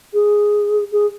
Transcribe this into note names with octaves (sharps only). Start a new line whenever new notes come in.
G#4
G#4